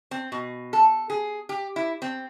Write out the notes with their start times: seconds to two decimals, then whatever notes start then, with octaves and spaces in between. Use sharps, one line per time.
0.11 C4
0.32 B2
0.73 A4
1.10 G#4
1.49 G4
1.76 E4
2.02 C4